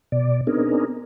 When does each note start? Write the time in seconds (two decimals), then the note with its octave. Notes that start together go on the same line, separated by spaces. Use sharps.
0.12 B2 D5
0.47 B3 C4 D4 D#4 G#4 A#4